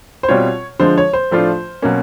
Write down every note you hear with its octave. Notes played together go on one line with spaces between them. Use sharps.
C5
B2 G3 C4 F4 C#5
D3 F3 G#3 C5
C#5
C5
A2 F3 A3 D4 F4
B2 F#3 A#3 C#4